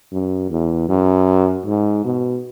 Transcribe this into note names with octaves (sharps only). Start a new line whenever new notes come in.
F#2
E2
F#2
G#2
B2